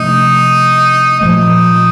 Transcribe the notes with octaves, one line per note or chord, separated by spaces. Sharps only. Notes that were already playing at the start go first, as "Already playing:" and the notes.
Already playing: C3 F3 A3 D4 D#4
A#2 F3 A3 D#4